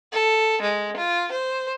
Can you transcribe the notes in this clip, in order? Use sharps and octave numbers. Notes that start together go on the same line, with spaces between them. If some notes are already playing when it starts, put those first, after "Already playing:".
A4
G#3
F4
C5